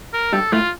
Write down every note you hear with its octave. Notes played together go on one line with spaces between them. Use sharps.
A#4
G2 G3 A4
A2 A3 F4